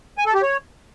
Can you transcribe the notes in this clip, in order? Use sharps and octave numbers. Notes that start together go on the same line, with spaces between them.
G#5
A4
G4
C#5